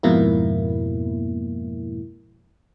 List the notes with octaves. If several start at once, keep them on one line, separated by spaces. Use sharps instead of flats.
F2 G#2 B2 A#3 E4